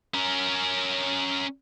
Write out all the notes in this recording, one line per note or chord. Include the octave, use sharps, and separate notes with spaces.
C#4 A#4